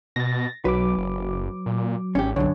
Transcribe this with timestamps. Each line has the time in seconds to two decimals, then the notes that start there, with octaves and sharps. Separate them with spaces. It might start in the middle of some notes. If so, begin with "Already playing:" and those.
0.16 B2 A6 A#6
0.65 B1 F#3 B4 D6
0.98 F#1
1.66 A#2
2.15 G#1 C#4 G4
2.36 B1 F#2 D3 C#5